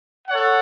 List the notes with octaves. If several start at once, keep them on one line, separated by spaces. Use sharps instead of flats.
A4 C#5 F#5